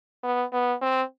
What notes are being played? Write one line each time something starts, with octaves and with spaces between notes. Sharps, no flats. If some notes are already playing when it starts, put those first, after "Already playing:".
B3
B3
C4